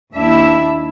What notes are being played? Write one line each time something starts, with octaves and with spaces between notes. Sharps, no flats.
D#2 D4 E4 E5